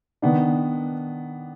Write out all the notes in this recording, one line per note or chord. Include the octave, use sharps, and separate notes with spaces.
D#3 B3 D4